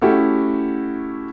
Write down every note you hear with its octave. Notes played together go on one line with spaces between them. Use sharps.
A3 C#4 E4 F#4 G4 A4